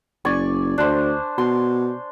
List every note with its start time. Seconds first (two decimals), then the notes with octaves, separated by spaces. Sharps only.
0.25 F#1 D5 G#5 C#6
0.78 D2 D4 C5
1.38 B2 C6